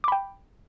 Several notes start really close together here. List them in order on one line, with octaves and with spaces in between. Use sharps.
D6 B5 G5